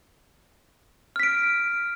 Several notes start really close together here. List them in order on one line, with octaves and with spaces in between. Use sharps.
F6 B6 D7